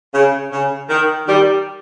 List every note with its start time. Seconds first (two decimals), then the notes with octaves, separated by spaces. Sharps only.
0.13 C#3
0.51 C#3
0.89 D#3
1.27 D#3 G3